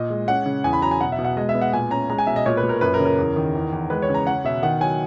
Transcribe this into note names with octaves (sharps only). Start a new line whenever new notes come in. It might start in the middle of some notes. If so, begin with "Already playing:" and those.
Already playing: A#2 D#5
G#3
C#4 F#5
C#3
E2 G#5
B5
F#3 A#5
G#5
B2 F#5
E5
B2
F#5
G#3 D#5
E5
B3
F#5
A#2 G#5
C#4 A#5
G#3 A#5
G#5
B2 E5
D#5
A#2 C#5
B4
A#2
A#4
F#2 B4
A#4
C#3
A#4
E2
D#3
E2
E2
G#3 B4
C#5
C#3
A#5
C#4 F#5
B2 E5
D#3 F#5
F#3 G#5